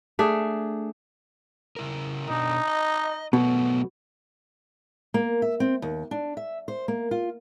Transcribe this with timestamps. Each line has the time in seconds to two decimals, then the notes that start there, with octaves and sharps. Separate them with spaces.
0.19 A3 D4 G#4
1.76 C#3 E4 A#4
2.30 B2 D4 D#4
2.68 D#5
3.33 B2 F#3 A3 B3
5.14 A#3
5.42 E5
5.60 C4
5.82 D#2
6.11 D4
6.37 E5
6.68 C5
6.88 A#3
7.11 F4